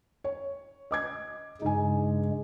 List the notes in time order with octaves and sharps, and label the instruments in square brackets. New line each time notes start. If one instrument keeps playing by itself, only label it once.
[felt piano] C#5
D#5 D6 G#6
[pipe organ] G2 C#3 G#3 [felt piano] D#4 G#5